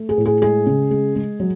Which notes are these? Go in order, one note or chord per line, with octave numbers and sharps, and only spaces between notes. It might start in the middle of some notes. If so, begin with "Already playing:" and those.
Already playing: A3
G#4
A2
G#4
G#3 G#4
C#3
G#3
G#3
F#3